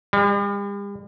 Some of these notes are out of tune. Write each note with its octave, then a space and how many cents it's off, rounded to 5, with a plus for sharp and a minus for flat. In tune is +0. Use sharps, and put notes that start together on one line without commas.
G3 +45